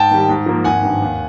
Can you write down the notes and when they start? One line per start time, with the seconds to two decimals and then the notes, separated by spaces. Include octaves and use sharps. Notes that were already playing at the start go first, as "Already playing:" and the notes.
Already playing: G#2 G5 A5
0.11 D#3 G3
0.29 G#2
0.46 F3 A#3
0.64 G#1 F#5 G#5
0.83 G2 D#3
1.02 D#2